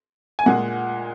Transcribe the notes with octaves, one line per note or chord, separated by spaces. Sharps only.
G#5
A#2 G#3 F#5